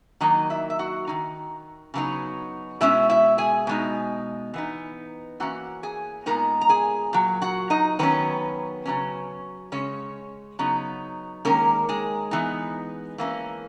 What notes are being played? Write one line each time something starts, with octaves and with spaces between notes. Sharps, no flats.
D#3 F#3 A#3 D#4 D#5
E4 E5
E5
F#4 F#5
D#3 A#3 D#4
C#3 F#3 B3 D#4
B2 G#3 C#4 E4 E5
E4 E5
G#4 G#5
B2 G#3 D#4
E3 B3 D#4
E3 A#3 C#4 F#4 F#5
G#4 G#5
A#2 G#3 B3 D#4 A#4 A#5
A#5
G#4 G#5
A#2 F#3
F#4 F#5
D#4 D#5
D#3 F#3 B3 C#4 B4
C#3 F#3 C#4
C#3 G#3 C#4 C#5
C#3 F#3 B3 D#4
D#3 G#3 A#3 C#4 A#4
G#3 G#4
E3 B3 D#4
E3 A#3 C#4